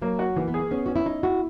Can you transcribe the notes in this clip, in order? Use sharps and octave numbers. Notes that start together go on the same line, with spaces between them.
F#3 A#3
F#4
E3 A#3
B3
G#4
A#3
B3 C#4
C#4 F#4
E4
D#4 E4
E4 F#4